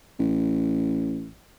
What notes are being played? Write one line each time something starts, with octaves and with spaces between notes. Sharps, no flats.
A1